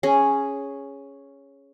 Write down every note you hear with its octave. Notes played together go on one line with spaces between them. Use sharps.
C#4 G#4